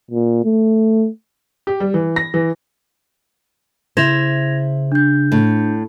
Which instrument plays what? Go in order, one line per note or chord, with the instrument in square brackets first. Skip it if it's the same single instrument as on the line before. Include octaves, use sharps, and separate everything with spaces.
[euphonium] A#2
A3
[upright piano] G4
G3
E3
A#6
E3
[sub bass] C#3 [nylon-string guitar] E4 C5 [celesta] G#6 A#6 F7
[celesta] D4 G6
[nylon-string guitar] A2